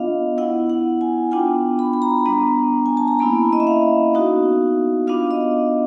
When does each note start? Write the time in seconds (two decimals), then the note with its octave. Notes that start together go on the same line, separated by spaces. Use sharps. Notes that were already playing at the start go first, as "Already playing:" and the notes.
Already playing: B3 D4 F4 D#5 F5
0.38 B3 E4 F#5
0.70 F#5
1.01 G#5
1.31 B3 D4 F4 G5
1.79 B5
1.93 B5
2.02 A#5
2.26 G3 B3 D4
2.86 G#5
2.97 A5
3.08 A#5
3.19 A#3 C#4 E4 B5
3.53 D#5
3.60 E5
3.67 F5
4.14 B3 D#4 F#4
5.07 B3 D4 F4 F5
5.31 D#5